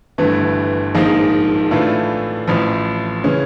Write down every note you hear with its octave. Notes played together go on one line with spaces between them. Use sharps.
G1 G2 E3 A3
A#1 G#2 F3 A#3 D#4
A2 E3 A3 D4 F4
A1 A2 F3
C#3 E3 G#3 C#4